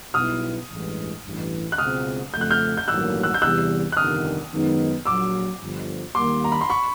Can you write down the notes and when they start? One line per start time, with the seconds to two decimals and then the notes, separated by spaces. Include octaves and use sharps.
0.14 B1 B2 G3 B3 E4 D#6 F6
0.69 A1 G2 E3 G#3
1.24 A1 G2 E3
1.72 F#6
1.78 C#2 B2 G#3 C4 F4 D#6 F6
2.33 F2 C#3 F3 A3 G6
2.41 F#6
2.51 F6 G6
2.77 G6
2.88 A1 G2 D#3 F#3 A#3 E6 F#6
3.23 E6 F#6
3.34 G6
3.42 E2 C3 E3 G3 E6 F#6
3.92 F#6
3.97 G1 F2 C3 D#3 G3 D#6 F6
4.51 F#2 D#3 G#3 B3 D#4
5.05 A#1 A#2 F#3 D6 E6
5.60 G1 G2 D3 F3
6.15 D#2 D#3 G3 A#3 C6 D6
6.44 A#5
6.52 B5
6.61 C6
6.70 B5 C#6